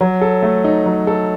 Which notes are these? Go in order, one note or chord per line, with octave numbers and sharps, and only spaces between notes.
F#3
A4
A3
D#4
F#3
A4